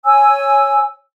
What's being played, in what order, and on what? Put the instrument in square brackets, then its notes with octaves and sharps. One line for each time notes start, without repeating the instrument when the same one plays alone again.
[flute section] C#5 G#5 E6